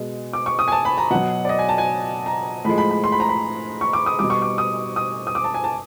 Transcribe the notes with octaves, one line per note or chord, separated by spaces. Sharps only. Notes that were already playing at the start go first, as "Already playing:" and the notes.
Already playing: B2 G#3
D6
C#6
D#6
G#5
A5
B5
A#5
B2 F#3 F#5
D5
D#5
G#5
A5
G#5
A#5
A2 F3 G#3 B5
B5
B5
C6
B5
A#5
B5
C#6
D6
D#6
B2 G3 D6
C#6
D6
D#6
D#6
D#6
D6
A5
G#5
A5